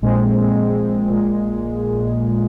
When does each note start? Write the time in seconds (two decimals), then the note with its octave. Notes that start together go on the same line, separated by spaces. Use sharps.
0.02 A#1 A#2 G#3 C4
1.08 A#1 A#2 G#3